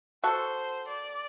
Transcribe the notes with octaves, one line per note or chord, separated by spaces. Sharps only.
F#4 A4 C5
D5